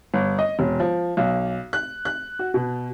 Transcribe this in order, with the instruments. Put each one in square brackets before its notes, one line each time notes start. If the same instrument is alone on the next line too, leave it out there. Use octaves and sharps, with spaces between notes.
[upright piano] G1
D#5
E1
F3
B1
F#6
F#6
F#4
B2